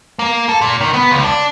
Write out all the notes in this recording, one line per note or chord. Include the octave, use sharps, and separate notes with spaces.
A#3
A4
A#2
D#3
B3
C#2
D4